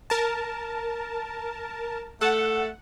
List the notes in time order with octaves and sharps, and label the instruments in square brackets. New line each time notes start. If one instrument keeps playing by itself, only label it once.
[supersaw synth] A#4 A5
[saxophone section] A3 A4 [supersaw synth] F#5